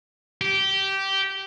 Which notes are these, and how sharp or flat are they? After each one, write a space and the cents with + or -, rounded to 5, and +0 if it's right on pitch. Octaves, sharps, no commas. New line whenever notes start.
G4 -15